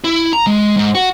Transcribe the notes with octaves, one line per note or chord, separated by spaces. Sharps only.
E4
A#5
G#3
G#2
F#4